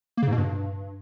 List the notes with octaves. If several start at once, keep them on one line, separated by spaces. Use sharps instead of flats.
A#3
C#3
G#2
B2
G2